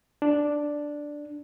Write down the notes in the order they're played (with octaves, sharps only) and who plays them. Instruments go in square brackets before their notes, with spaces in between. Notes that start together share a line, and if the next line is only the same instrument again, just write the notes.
[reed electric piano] D4